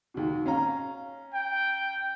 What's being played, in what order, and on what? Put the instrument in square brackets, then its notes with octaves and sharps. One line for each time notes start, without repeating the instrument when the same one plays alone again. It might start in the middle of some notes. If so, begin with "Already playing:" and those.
[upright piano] D#2 B2
C#4 F5 A#5
[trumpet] G5